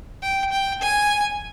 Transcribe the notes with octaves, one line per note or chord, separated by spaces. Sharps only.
G5
G5
G#5